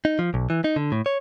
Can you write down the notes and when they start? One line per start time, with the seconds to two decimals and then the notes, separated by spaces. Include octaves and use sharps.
0.05 D#4
0.19 F3
0.34 B1
0.50 E3
0.64 D#4
0.76 D3
0.92 A2
1.06 C#5